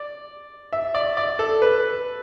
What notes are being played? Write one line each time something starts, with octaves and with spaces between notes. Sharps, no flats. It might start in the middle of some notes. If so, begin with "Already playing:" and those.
Already playing: D5
E5
D5
D5
A4
B4